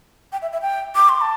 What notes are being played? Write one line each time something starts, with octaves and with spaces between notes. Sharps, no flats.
G5
E5
E5
G5
D6
C6
A5